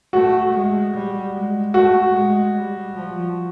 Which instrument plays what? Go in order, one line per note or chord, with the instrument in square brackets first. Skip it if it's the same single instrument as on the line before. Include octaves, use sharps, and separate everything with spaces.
[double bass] A3 [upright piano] F#4
[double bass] G#3
G3
G#3
[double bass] A3 [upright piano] F#4
[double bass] G#3
G3
F3